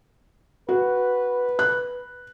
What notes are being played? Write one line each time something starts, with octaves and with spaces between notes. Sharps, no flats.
F#4 B4
F#6